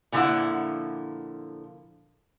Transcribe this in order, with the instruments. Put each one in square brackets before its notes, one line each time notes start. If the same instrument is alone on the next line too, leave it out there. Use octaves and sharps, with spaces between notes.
[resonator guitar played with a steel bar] A#2 D3 F3 F#3 E4 F#5